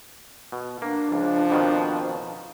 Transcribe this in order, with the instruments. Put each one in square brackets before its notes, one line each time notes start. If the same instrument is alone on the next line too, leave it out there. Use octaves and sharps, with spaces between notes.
[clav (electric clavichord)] B2
[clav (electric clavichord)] A#3 [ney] D4
[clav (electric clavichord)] C#2 [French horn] F3
[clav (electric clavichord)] F2 B2 D#3